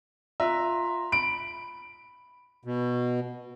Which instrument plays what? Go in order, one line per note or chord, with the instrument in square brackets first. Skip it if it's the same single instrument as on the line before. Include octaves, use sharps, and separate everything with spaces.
[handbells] F4 A#5 [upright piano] E5
[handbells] B5 [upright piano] D7
[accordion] B2